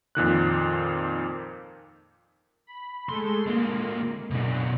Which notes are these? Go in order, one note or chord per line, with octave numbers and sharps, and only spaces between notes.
F2 A#2 D#3 F#6
B5
G#3 A3 A4 C6
D3 G#3 A#3
F#2 B2 D4